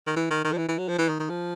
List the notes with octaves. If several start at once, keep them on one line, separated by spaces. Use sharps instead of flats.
D#3
E3
D#3
D#3
F3
E3
E3
F#3
F3
E3
D#3
D#3
F3